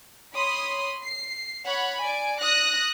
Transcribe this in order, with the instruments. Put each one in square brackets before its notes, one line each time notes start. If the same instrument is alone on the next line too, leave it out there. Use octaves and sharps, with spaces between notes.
[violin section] C#5 B5 C6 D#6
C7
C#5 F#5 B5
D5 G#5 D7
D#6 F#6 A#6